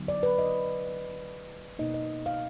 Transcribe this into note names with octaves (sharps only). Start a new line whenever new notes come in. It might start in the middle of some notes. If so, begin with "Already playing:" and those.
Already playing: D3 F#3 B3 D#4
D5
B4
D#5
B2 A#3 D#4 D#5
D#5
F5